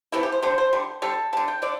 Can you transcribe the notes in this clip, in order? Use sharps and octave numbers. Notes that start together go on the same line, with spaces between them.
C3 E3 A3 E4
G4
C5
D3 G3 C5
C5
D3 G3
D3 G3 A4
D3 G3 A5
G5
D3 A3 D5